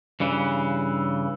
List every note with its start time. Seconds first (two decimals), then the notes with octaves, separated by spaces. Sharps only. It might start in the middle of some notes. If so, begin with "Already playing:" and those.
0.20 G2 C#3 E3